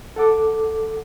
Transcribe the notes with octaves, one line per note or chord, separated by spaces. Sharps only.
A4 F#5 D6